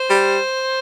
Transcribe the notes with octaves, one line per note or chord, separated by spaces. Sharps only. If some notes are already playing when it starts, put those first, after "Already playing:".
Already playing: C5
G3